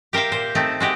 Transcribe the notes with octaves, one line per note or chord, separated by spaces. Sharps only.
G4 A#4 C5 E5 F5
A#2 C5
A3 C4 D#4
G#3 F#4 G4